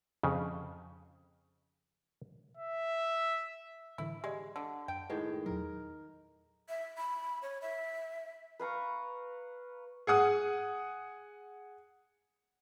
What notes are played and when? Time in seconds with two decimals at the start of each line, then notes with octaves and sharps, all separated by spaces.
0.23 F2 C#3
2.57 E5
3.98 A2 D3 E3 E4
4.24 G#3 G4 D5 D#5
4.56 D3
4.88 F#2 G5
5.10 A2 D#3 G#3 B4
5.46 E2 A#2 F#3 A#4
6.69 E5
6.98 B5
7.42 C#5
7.62 E5
8.59 B4 F5 A#5 C#6
10.07 G#4 F#5 D#6